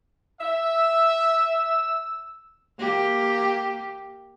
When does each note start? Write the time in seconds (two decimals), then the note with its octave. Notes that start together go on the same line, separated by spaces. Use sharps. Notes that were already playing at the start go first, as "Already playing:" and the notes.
0.41 E5 E6
2.79 A#3 G4